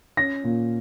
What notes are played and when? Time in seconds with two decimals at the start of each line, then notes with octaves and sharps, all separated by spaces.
0.17 C#4 A#6
0.44 A#2